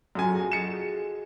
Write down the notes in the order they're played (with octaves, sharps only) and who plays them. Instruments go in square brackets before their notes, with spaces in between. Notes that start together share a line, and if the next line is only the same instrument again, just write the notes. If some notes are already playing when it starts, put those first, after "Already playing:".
[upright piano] F#2 G#5 [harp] F4 F#4 A4
[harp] G#4 A#6
[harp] F#4 D#5 A6 [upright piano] C#7 E7